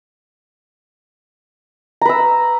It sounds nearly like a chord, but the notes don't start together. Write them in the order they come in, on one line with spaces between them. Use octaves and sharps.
A#5 B4 E6